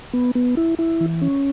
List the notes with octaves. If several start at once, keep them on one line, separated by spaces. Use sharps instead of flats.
B3
B3
E4
E4
E3
C#4